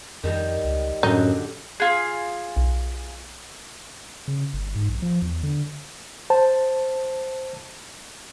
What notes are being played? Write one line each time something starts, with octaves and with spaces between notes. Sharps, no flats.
F2 D#3 G3 A#4
C#2
F#2 A2 D3 F#3 G3 D#4
F4 G#4
B1
C#3
G1
G#2
A#1
F3
E2
D3
C5 A5